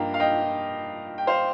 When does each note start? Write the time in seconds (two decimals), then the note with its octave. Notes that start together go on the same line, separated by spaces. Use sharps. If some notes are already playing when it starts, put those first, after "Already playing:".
Already playing: G2 F3 A#3 D#4 F5 G5 A#5
0.14 F5
0.20 D#5 G5
1.18 G5
1.27 C5 F5